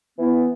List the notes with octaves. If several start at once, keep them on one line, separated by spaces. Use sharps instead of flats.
E3 B3 E4